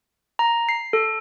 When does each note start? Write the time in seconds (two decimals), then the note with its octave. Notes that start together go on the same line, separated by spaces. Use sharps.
0.39 A#5
0.69 C7
0.93 A4